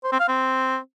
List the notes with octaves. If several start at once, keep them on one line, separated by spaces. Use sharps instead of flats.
C5
C4
F5
C4